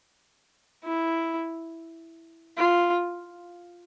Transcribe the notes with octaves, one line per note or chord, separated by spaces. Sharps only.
E4
F4